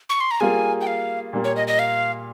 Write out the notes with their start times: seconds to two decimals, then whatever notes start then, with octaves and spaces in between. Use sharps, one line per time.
0.09 C#6
0.20 C6
0.31 A#5
0.40 G3 A#3 F4 G#4 G#5
0.81 G5
0.87 F5
1.33 A#2 G3 A#3
1.44 C#5
1.56 D#5
1.68 D#5
1.79 F5